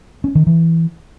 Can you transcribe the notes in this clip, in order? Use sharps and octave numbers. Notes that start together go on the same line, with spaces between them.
C#4
D#3
E3